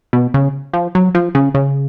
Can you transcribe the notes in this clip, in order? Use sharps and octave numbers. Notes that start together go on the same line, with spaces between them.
B2
C#3
F3
F#3
F3
C#3
C#3